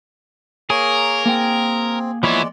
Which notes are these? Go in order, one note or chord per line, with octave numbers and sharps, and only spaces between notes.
A#3 G#4 A#4 C#5
A#3 C4 G5
E3 F3 G#3 B3 E4 C#5 D5